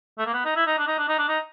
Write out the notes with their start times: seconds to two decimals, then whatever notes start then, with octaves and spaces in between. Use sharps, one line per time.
0.18 A3
0.26 A#3
0.34 B3
0.45 D#4
0.56 E4
0.66 D#4
0.78 D4
0.88 D#4
0.98 D4
1.09 D#4
1.19 D4
1.29 D#4